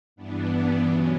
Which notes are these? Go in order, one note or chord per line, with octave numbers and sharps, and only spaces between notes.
G2 E3 B3 D4
B2 F#3 C#4